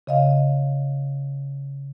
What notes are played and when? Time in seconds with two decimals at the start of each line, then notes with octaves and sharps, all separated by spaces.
0.07 C#3 D#5 F5